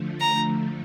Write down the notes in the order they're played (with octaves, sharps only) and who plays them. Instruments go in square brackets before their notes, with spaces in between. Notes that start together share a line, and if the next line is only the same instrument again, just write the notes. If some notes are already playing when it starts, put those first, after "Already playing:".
Already playing: [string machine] D3 F3 A3
[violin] A#5